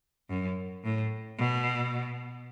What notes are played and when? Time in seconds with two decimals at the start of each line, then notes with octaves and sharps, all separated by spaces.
0.30 F#2
0.84 A2
1.38 B2